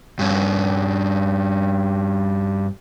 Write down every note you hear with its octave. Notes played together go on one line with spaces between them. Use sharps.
G2 C#4